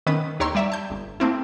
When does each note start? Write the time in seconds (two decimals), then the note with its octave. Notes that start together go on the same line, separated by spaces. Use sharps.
0.06 D#3 B3 C#4 B4 D#6
0.40 D#2 G4 C#5 A#5 C6 E6
0.55 G3 D5 E5 A#5
0.72 A5 G6
0.90 G1
1.20 A3 A#3 C4 E4